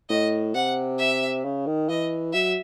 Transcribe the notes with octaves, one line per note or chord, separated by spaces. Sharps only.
A2 D#5
C3 F#5
E5
C#3
D#3
E3 D#5
F#3 E5